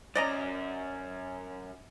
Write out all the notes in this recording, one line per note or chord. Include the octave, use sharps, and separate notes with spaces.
F#2 C#4 D5 D#5 A#5